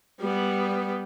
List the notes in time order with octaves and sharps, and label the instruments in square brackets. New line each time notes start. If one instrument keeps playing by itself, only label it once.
[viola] G3 B3